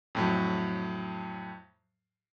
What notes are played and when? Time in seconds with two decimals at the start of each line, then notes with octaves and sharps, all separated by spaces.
0.15 F2 A2 F#3